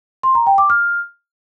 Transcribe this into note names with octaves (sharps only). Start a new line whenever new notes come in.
C6
A#5
G5
D6
F6